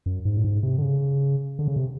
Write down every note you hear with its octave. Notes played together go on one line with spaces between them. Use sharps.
F#2
G#2
A2
G#2
C3
D3
C#3
D3
C#3
C3